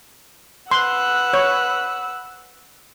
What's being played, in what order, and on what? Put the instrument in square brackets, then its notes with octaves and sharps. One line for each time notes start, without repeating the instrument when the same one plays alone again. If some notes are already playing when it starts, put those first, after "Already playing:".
[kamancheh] B4 F#6 [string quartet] F#5 E6 [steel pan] C6
[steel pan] C#5